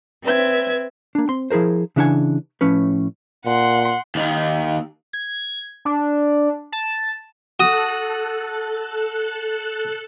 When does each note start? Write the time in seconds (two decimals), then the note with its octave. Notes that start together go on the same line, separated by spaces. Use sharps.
0.23 C4 B4 E5 G#6
1.15 A#3 D4
1.29 C4 C6
1.51 F3 E4 G#4 A#4 C5
1.96 C#3 E3 D4 G#4 F#5 G#5
2.61 A2 F3 C#4 B4
3.46 A#2 F#5 C6
4.15 D#2 D#3
5.13 G#6
5.85 D4
6.72 A5
7.60 F#4 A4 D#6 F#6